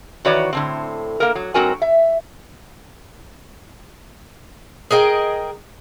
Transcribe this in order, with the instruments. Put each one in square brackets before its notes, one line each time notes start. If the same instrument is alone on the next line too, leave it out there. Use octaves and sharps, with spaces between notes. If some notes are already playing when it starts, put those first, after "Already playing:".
[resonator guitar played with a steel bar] D#3 E3 F#4 B4 C#5 D5
A2 D3 C4
A#3 A#4
F#3
G#2 F#3 C4 F#4 A#4 G#5
E5
[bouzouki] G#4 A#4 D#5 G5